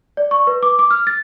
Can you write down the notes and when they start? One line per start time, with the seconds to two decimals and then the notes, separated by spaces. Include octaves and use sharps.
0.17 D5
0.31 C#6
0.47 B4
0.63 D6
0.79 D6
0.91 F6
1.07 A6